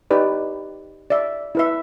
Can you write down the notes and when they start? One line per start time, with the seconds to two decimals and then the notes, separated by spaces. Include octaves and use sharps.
0.11 D#4 G4 B4 D5
1.10 D5 E5
1.55 E4 B4 E5